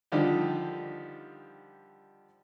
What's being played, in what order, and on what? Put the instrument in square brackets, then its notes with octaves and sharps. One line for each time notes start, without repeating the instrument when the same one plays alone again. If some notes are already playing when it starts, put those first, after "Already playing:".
[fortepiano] D3 D#3 F3 G3 D#4 G4